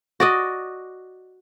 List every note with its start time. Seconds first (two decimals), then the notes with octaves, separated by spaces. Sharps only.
0.20 F#4 D5 D#5